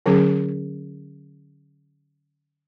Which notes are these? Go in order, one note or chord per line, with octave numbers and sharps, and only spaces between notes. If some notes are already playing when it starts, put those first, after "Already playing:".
D3 F#3 C#4 G#4